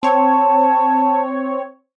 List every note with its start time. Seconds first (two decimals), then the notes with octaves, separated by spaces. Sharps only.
0.03 C4 C#5 A5